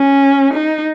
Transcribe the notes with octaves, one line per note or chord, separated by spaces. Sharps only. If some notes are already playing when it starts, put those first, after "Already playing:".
Already playing: C#4
D#4